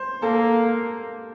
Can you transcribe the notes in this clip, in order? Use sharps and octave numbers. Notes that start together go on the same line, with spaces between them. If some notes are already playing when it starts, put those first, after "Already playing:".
Already playing: C5
A#3 A4